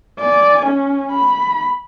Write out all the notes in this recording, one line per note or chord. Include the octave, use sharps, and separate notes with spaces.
D5 G#5
C#4
B5